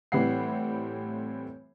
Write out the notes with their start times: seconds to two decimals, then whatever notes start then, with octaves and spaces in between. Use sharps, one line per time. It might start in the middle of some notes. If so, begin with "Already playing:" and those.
0.12 A2 E3 G3 C4 F#5 C7